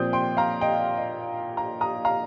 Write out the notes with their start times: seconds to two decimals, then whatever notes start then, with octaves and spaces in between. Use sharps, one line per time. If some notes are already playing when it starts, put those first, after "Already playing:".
Already playing: A#2 F3 C4 D#6 G6
0.13 G5 C6
0.37 F5 A#5
0.61 D#5 G5
0.97 D#5
1.57 F5 A#5
1.81 A#5 D#6
2.05 F5 A#5